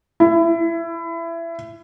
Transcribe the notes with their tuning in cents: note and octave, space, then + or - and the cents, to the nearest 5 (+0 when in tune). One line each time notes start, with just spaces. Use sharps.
E4 +25